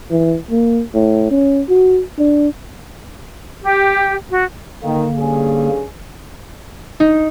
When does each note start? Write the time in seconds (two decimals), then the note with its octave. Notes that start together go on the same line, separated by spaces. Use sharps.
0.11 E3
0.50 A#3
0.94 A2
1.31 C#4
1.69 F#4
2.18 D4
3.63 G4
4.29 F#4
4.84 D3 D#3 A#3
5.16 G2 C#4 G#4
7.00 D#4